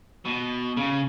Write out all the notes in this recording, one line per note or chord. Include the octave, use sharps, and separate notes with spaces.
B2
C#3